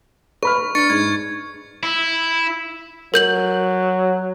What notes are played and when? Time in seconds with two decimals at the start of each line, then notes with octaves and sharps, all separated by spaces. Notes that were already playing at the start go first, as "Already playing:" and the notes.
0.43 B4 B5 C#6 F6
0.75 D4 C#6 A6 C#7
0.90 G#2 G#6
1.83 E4
3.14 F#3 A#4 G6 F#7